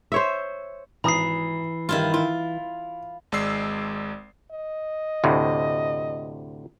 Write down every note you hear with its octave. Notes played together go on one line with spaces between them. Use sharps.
C5 C#5 E5
G#1 E3 A#5 B5 D#6 C7
G2 D#3 G3 E4 F4
E4 F4
G#1 G#3 D5 E6 C7
D#5
D2 A2 C3